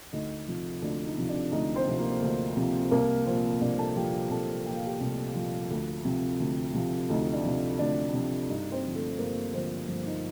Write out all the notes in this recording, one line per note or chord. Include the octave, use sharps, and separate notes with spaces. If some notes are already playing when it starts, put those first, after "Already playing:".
D2 D#4 D#5
C3 F3
D2 D4 D5
D#4
C3 F3
D4
D2 D#4
C4 C5
C3 F3
A#3 A#4
D2
C3 F3
C2 A#3 A#4
A#2 F3 C4 C5
C2 D4 D5
A4 A5
A#2 F3 G4 G5
G4 G5
C2 A4 A5
A#2 F3 G5
F5
G4 G5
C2 A3 A4
A#2 F3 F4
D2
C3 F3
D2
C3 F3
D2 D#4
D4
C3 F3
D2 D4
C3 F3 D4
G2 D#4
C4 C5
D3 F3
A3 A4
G2 A#3 A#4
D3 F3 C4 C5
G2 F3 F4
D#4